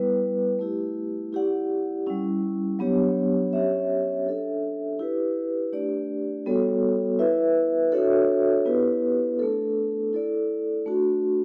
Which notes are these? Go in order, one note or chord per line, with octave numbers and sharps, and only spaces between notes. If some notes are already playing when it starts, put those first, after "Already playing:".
Already playing: G3 B3 E4 B4
A3 E4 G4
E4 G4 D5 F#5
G3 C#4 E4
F#3 B3 D4 G4 C#5
C#4 G4 C#5 E5
D4 A4 E5
E4 G4 B4
A3 D4 G4 D5
G3 B3 F#4 A4 C#5
E4 B4 E5
D4 F#4 A4 C#5 E5
B3 E4 G4 B4
A3 D4 A4
E4 A4 D5
A3 D4 F#4